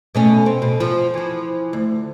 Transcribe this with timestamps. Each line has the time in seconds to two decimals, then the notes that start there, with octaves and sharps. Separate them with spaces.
0.15 B2 A3 C#4
0.46 C4
0.62 B2
0.80 F3
1.14 E3 F3
1.73 D2